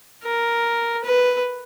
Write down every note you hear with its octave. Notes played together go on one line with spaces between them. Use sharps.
A#4
B4